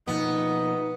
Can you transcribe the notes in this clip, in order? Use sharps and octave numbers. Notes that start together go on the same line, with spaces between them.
B2 F3 A#3 B3 D#4 D#5